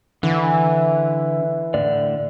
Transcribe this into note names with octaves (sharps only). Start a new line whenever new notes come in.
D3 E3
A2 D3 D5